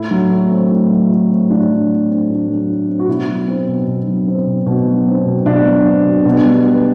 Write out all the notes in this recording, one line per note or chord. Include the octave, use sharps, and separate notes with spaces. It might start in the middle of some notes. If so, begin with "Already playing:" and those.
Already playing: A2 E4
F#3
A3
C4
A2
F#3
A3
C4
A2 D4
F#3
A3
C4
A2
F#3
A3
C4
F#4
B2 E4
F#3
C4
B2
B2
F#3
C4
B2
B2
F#3
C4
B2
B2 D4
F#3
C4
B2
B2
G3
B3